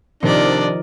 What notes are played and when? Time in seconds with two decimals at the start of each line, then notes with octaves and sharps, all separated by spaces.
0.23 C3 D#3 F3 D4 A#4 D5 D#5